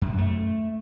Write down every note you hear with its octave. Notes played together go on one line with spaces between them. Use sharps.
F#2
A3